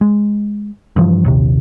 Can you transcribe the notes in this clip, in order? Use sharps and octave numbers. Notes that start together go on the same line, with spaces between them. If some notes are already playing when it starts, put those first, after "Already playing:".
G#3
G2 C#3 E3 F3
A#1 D#2 C3